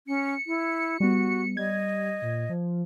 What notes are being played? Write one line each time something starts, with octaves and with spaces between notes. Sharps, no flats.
C#4 C#7
E4
G3 B3 F#4
G3 D#5 G#6
A#2
F3